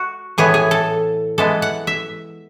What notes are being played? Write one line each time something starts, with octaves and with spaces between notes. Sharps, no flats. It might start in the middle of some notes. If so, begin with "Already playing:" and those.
Already playing: F#4
A2 E3 B3 G#4
G#4
A4
E3 G#3 B3 A4
F#5
E5